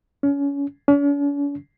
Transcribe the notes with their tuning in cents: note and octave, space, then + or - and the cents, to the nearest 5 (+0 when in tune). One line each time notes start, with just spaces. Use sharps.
C#4 +25
C#4 +45